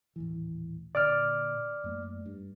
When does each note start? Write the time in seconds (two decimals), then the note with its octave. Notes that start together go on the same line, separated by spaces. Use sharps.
0.16 D#1 A1 E3
0.95 A#2 D3 D5 D6 F6
1.84 F#2 A3 A#3
2.26 G2